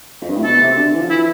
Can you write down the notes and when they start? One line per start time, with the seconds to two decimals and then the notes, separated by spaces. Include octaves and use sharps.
0.21 F2
0.29 G2
0.37 A2
0.44 B2 A4
0.61 C3
0.71 C3
0.77 D3
0.94 E3
1.01 F3
1.09 E3 E4